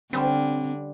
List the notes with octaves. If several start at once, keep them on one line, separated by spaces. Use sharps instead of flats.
D3 G3 C4 C#4 C5